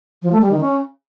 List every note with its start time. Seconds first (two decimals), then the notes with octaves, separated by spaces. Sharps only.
0.23 F3
0.32 A3
0.42 G3
0.51 D#3
0.61 C#4